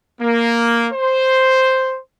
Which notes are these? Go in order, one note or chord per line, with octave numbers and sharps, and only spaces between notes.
A#3
C5